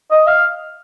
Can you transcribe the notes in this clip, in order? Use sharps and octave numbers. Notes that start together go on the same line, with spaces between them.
D#5
F5